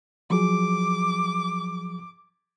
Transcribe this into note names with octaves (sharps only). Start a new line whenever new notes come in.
F3 F#3 G#4 D6